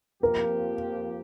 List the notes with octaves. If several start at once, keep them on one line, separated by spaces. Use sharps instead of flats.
F2 F3 A#3 G4 A#4